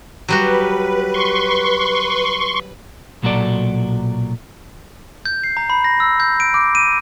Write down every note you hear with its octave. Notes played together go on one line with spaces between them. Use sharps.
F#3 G3 F#4 B4
C6 C#6
B1 A#2 F#3 F#4 A4 D5
G6
C7
A#5
B5
A#6
E6
G6
D7
D6
D#7